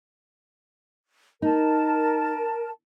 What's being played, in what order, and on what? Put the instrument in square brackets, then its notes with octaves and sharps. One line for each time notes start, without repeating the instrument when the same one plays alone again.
[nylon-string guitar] D#4 [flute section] A#4 A5